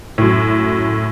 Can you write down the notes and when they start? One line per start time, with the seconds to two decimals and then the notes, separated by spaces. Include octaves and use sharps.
0.18 F#2 A2